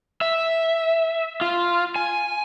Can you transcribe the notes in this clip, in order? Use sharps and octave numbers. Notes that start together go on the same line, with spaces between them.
E5
F4
G#5